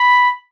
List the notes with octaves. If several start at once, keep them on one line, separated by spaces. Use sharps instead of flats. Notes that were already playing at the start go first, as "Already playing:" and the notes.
Already playing: B5